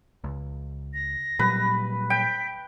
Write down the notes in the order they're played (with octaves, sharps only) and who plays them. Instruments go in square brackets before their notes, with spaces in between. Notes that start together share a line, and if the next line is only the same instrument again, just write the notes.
[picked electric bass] C#2
[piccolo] A#6
[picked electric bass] A#2 F#3 G3 [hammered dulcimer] B4
[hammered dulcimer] G5 [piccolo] B6